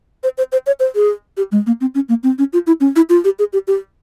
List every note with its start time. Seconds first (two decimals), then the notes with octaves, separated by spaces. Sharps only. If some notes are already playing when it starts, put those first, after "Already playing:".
0.24 C5
0.38 C5
0.52 C5
0.67 C#5
0.80 C5
0.95 G#4
1.37 G4
1.52 G#3
1.66 A#3
1.81 C4
1.95 C#4
2.09 A#3
2.23 C4
2.39 C#4
2.53 F4
2.67 E4
2.81 C#4
2.96 E4
3.10 F4
3.24 G4
3.39 G#4
3.53 G4
3.68 G4